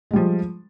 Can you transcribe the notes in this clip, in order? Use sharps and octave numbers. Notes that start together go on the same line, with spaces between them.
F3 G3 G#3